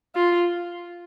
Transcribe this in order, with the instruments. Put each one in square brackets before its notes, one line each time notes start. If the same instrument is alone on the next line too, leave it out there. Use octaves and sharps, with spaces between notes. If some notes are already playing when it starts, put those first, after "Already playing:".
[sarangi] F4